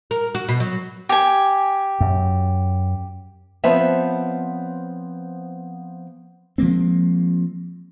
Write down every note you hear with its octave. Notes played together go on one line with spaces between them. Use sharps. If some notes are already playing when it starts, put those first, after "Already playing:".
A#4
F#4
B2
F#3
G4 G#5
F#2
F3 B3 C4 B4 C#5 E5
F3 G#3 A#3 C4